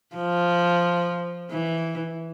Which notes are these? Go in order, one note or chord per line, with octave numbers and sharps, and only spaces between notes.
F3
E3